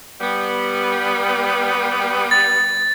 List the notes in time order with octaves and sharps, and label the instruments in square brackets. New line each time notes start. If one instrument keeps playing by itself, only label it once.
[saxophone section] G3 B3
[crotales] A6